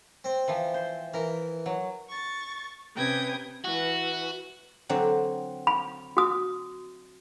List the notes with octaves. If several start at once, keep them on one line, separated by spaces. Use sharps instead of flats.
C4
E3 F3
C5
E3 A#4
F#3
C#6 A6
C3 C#4 B4 G5 D#6 G#6
E3 F#4 B4
D3 F#3 C4
B5
F#4 D#6